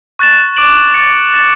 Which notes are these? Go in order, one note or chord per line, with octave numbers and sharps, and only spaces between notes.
C#6 F#6 A6 E7
D6 A6 D7 F#7
D6 A6 C#7
F#6 A6 E7